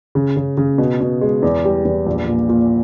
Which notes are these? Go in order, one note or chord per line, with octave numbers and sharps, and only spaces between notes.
C#3
C#3
C#3
B2
B2
G#3
E2
G3
E2
A#1
A#2
A#2